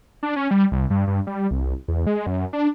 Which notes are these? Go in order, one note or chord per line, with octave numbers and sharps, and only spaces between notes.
D4
C#4
G3
C2
G2
G2
G3
C2
E2
G#3
F#2
D4